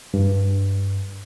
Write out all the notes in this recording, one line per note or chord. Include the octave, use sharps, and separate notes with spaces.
G2